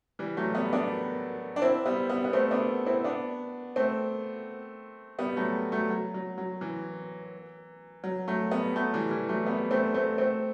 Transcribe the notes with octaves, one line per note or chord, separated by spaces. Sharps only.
E3 G3
F#3 A3
G3 B3
B3 D4
D4
C4 E4
G3 B3
G3 B3
B3
A3 C4
B3 D4
C4 E4
B3 D4
A3 C4
G3 B3
F#3 A3
F#3 A3
F#3
F#3
F#3
E3
F#3
F#3 A3
G3 B3
F#3 A3
E3 G3
E3 G3
F#3 A3
G3 B3
A3 C4
A3 C4
A3 C4